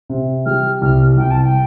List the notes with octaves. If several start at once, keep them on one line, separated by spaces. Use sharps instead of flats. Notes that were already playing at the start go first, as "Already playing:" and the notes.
C3
G3 F6
C2 F6
C2 G5
A5
G5